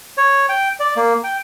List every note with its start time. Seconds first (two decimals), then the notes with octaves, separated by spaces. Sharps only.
0.17 C#5
0.49 G5
0.80 D5
0.96 A#3
1.24 G5